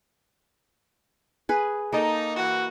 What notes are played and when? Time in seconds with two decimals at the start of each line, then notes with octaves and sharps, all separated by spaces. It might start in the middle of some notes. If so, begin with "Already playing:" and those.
1.49 G#4 B4
1.92 A#3 D#4 A4
2.36 E3 F#4